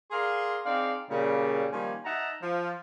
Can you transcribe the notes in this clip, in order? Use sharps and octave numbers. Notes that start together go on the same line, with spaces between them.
G#4 A#4 D5 F5 C6
C4 D#4 G#4 D5 F5
A#2 C#3 G3
D#3 F3 G3 A#3 C#4 G#5
D#4 E5 F#5 A5 A#5
F3